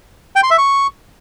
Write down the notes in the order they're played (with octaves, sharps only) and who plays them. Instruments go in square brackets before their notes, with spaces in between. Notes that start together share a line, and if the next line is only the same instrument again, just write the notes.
[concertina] G5
C6
E5
C#6